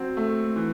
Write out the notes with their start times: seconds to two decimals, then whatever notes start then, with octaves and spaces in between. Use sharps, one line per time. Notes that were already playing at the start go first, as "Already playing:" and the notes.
Already playing: F#3 C4
0.17 A3
0.56 E3